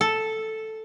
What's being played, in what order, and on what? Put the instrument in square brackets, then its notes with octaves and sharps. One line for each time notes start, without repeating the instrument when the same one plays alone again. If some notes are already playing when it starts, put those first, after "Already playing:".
[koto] A4